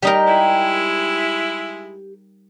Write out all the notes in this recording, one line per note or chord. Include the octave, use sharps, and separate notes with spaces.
G3 D#4 G4 A#4 G5
G#3 E4